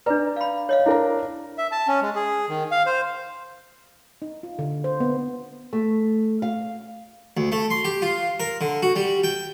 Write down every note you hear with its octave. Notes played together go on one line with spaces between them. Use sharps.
D4 B4 D5 A#5
F5 B5
C#5 D#5 F5
D4 E4 A#4 A#5
E5
A5
C#4
G#3
G#4
D#3
F5
C5
D#4
F4
D3
C5
B3
A3
F5
D2
A3
C6
G4
F4
A#4
D3
F#4
G3
G5